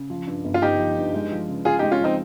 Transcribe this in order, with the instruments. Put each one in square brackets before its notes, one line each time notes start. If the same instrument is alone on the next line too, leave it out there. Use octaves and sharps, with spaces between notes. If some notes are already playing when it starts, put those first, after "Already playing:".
Already playing: [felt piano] C#3
F3
G2
G1
[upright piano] F4
[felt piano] G1 [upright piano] D#4 G4
[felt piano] F3
G2
G#3
F3
C#3
[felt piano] C#3 [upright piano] F4 G#4
[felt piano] G#3 [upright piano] D#4 G4
[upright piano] C#4 F4
[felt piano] F3 [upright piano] C4 D#4